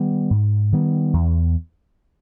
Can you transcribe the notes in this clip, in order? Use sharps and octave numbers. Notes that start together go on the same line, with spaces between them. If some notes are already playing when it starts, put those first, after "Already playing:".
Already playing: D#3 G3 B3
G#2
D#3 G3 B3
E2